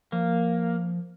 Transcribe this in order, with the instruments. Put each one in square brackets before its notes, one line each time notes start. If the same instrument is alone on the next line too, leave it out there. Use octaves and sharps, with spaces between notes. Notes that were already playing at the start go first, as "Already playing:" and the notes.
[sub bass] F3 [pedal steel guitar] A#3